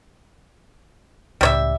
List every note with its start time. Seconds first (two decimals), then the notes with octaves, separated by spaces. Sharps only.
1.41 C#2 A2 C#3 G3 C#5 E5